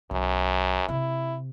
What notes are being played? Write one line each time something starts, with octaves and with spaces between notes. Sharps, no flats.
B1 F#2
C3 E4